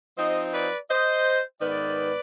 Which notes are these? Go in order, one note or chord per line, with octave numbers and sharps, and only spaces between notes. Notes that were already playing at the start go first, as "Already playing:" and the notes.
F3 C4 D#4 C5 D#5
B4 D5
C5 D#5
G#2 D#3 B3 B4 D5